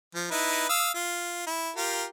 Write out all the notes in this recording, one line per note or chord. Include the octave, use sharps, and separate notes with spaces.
F3
D#4 E4 B4
F5 D#6 E6
F4
E4
F4 G4 A#4